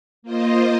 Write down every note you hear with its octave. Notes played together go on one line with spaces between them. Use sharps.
A#3 F4 C5 D#5